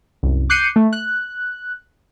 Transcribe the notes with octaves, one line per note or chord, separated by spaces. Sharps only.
C2 F#2
D6 F#6 G6 C7 C#7 D#7
A3
F#6